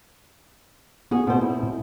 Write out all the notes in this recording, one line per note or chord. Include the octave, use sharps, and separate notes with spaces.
B3 F#4 G#4
B2 C4 C5
E4
A#2